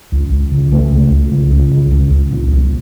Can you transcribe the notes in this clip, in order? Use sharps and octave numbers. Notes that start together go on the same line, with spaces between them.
C#2
C#2
C#3
C#3 A3
C#2
C#2
C#3
C#2
C#3
C#2
C#2
A#2
C2